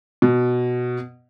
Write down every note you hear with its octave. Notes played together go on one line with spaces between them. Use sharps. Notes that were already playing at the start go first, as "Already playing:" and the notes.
B2